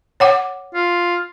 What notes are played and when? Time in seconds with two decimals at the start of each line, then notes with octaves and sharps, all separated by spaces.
0.20 C#5 F#5 D6
0.75 F4